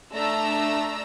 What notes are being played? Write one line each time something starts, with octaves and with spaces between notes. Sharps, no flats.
A3 D4 A#5 E6